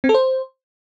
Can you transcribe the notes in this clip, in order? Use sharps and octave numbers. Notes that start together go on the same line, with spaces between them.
C4
A4
C5